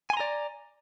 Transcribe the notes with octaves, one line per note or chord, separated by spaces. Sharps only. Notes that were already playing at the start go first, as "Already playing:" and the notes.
D5 G#5 A#5 C6